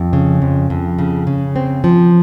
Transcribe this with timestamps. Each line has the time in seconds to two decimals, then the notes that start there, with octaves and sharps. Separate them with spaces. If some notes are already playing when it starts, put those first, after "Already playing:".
Already playing: F2
0.13 C#3
0.42 F2
0.70 F2
0.99 C#3
1.27 C#3
1.56 C4
1.84 F3